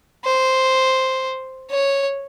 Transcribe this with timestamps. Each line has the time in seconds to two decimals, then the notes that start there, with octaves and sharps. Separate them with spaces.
0.24 C5
1.71 C#5